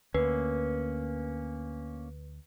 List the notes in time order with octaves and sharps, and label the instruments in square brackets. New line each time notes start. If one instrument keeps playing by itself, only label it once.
[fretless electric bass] D2 [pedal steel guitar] A#3 C#4 [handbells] B4